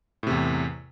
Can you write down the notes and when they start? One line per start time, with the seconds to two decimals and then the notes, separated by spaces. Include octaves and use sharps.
0.23 A2
0.27 C3
0.31 E2